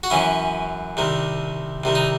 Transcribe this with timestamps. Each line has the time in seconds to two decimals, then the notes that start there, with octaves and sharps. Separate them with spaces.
0.03 F#4
0.10 F#2 E3 C#4 E4
0.97 C2 C3 D#3
1.84 C2 C3 D#3
1.95 D#4